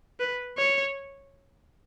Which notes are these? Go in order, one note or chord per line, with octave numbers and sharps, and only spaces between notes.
B4
C#5